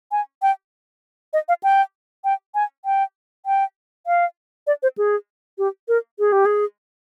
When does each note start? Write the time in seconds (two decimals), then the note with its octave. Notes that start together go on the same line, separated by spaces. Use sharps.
0.12 G#5
0.42 G5
1.33 D#5
1.48 F5
1.63 G5
2.24 G5
2.55 G#5
2.85 G5
3.46 G5
4.07 F5
4.67 D5
4.83 C5
4.98 G#4
5.58 G4
5.88 A#4
6.19 G#4
6.32 G4
6.46 G#4